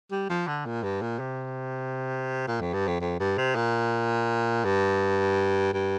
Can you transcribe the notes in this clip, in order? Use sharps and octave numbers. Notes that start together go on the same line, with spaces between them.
G3
F3
D3
A#2
G2
A#2
C3
A#2
F2
G2
F2
F2
G2
C3
A#2
G2
G2